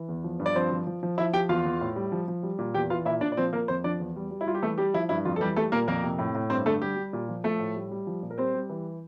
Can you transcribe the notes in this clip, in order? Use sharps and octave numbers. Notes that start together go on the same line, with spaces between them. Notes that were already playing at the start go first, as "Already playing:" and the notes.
Already playing: E3
E2
F3
G2
D5
F3 C4 C5
F3
F3
F3
F3 E4 E5
F3 G4 G5
E2 F4 F5
E2
A2
G3
F3
F3
G3
A#2
E2 G4 G5
E3 F4 F5
A#2 E4 E5
A#2 D4 D5
D5
F3 C4 C5
F3 A#3 A#4
F2 C4 C5
F3 D4 D5
E2
G3
G3
E4
G3 F4
G4
E3 A3 A4
G3 G4
F3 E4
G2 E4
F2 F4
A4
E3 G3 G4
G3 A3 A4
A#2 A#3 A#4
F2 A#3 A#4
C3
A2
A2
G2 C4 C5
D3 A3 A4
G3 G4
G3
A#2
F3
F3 A3 A4
A2
G3
G3
F3
A#2
A#4
G3 C4 C5
G3
E3